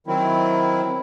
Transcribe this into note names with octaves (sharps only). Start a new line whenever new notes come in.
D#3 F#3 C4 E4